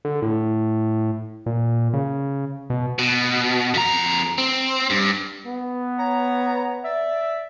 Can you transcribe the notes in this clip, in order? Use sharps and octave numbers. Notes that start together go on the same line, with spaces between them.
D3
A2
A#2
C#3
B2
B2
F2 A#5
C4
G2
B3
C#5 A#5
D5 E5